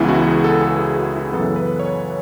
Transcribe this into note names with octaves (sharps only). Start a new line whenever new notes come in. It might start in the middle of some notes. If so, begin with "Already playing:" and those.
Already playing: C#2 C#3 E3 B3 E4
F#4
G#4
A4
A4
G#4
F#4
E4
F#2 C#3 E3 B3 A4
B4
C#5